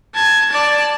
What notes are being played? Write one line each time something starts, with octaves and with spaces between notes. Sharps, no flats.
A5 G#6
D5 A5